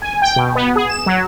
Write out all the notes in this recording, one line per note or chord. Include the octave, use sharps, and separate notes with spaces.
G#5
G5
B2
B3
G#4
E7
F#3